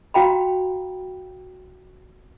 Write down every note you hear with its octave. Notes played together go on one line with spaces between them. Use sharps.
F#4 F5 G5 A#5 B5